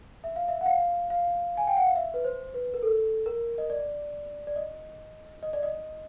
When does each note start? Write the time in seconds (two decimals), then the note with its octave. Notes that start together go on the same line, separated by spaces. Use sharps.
0.24 E5
0.36 F5
0.48 E5
0.61 F#5
0.66 F5
1.10 F5
1.57 G#5
1.67 G5
1.77 F#5
1.87 F5
1.96 E5
2.14 B4
2.24 C5
2.54 B4
2.74 A#4
2.83 A4
3.26 A#4
3.58 D#5
3.70 D5
4.47 D5
4.56 D#5
5.43 D#5
5.53 D5
5.63 D#5